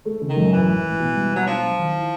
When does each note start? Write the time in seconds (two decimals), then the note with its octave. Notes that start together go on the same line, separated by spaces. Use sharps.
0.05 A3
0.21 C#3
0.29 D#3
0.37 F#2
0.52 A1 E3
0.68 A2
0.84 A1
0.99 B2
1.15 G3
1.31 B2 F#3
1.46 F3 D4
1.62 F#3
1.78 D#3
1.94 E4